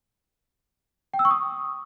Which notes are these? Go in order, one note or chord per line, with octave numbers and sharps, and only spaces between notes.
G5
E6
C#6
D#6